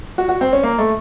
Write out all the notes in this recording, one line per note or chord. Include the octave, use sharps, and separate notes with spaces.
F#4
F#4
C4
C#4
A#3
A3